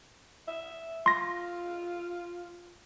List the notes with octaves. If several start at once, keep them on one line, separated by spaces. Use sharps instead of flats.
E5
F4 C6 A#6